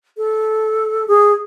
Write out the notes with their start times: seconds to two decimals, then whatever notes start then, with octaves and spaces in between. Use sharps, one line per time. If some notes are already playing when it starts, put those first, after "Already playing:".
0.17 A4
1.08 G#4